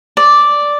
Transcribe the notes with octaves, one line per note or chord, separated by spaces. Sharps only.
D5